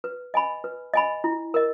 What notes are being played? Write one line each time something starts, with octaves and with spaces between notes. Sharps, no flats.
B4
D#5 G#5 B5
B4
D#5 G#5 B5
E4
A#4 D#5